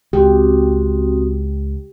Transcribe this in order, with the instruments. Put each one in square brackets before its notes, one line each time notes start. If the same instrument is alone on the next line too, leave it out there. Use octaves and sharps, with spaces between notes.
[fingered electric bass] C#2 [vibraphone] C4 F#4 D#6 [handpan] G4